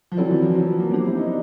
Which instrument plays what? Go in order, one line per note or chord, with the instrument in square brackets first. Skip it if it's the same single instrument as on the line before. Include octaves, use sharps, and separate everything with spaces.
[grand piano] F3
[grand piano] F#3 [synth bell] C4 E4 A4 D5
[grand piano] E3
F3
F#3
A#3
[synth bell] F#3 B3 D4 G4 C5 [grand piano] C4
[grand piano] E4
D#4
D4